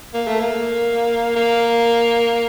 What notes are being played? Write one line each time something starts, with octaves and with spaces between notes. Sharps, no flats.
A#3
A3
A#3
A#3